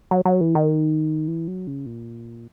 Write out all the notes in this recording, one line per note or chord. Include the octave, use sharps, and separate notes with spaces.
F#3
F#3
E3
D#3
E3
F#3
C#3
A#2